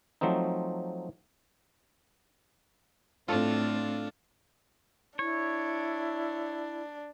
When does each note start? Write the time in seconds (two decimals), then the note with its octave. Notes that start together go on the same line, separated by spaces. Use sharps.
0.21 F3 F#3 A3 C4 D#4
3.28 A2 C4 D4 F4 A4
5.19 D4 E4 C#5